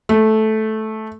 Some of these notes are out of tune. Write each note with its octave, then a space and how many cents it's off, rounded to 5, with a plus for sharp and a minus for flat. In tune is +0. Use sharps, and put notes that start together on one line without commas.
A3 -10